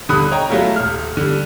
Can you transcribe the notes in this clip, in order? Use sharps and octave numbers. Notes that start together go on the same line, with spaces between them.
D#1 D3 G3 B5 D#6 F#6
C#5 D#5 G5 A#5
F#3 G#3 A3 E4 F4
D#1 F6
D3 G3